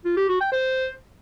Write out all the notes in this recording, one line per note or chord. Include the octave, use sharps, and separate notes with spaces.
F4
G4
F#4
G5
C5